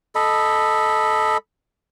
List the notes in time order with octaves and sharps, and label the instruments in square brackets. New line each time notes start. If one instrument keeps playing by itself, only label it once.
[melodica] A4 D#5 B5